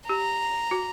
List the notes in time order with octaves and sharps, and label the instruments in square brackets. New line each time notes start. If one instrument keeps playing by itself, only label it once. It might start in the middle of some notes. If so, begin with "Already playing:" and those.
[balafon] G4 [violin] A#5
[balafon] F#4